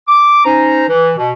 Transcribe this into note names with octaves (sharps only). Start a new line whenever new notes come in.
D6
C#4 D#4 C5 A#5
E3
B2